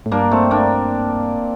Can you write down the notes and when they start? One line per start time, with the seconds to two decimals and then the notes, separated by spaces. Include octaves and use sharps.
0.06 A2
0.12 G2 A#3 D4
0.31 A3 C4
0.51 A#3 D4